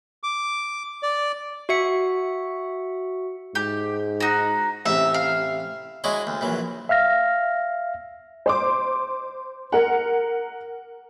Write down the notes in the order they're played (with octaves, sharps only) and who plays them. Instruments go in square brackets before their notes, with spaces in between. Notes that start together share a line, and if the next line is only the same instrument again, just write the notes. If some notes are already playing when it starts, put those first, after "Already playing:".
[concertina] D6
D5
[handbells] F#4 E5 C#7
[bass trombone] G#2 [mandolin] G4
[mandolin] D#4 F#4
[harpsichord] A1 C3 [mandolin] E5
[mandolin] F5
[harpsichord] G#3 D4 E4 F#4 C#5 D#5
D2
A#1 E3 F#3
[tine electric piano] E5 F5 F6 A#6
[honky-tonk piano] C5 C6 D6
A#4 F#5